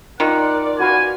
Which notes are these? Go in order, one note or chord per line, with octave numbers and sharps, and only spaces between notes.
D#3 F4 A#4 D5 F#5
F#4 B4 F5 G#5